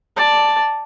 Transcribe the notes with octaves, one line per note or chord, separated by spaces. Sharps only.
D5 A5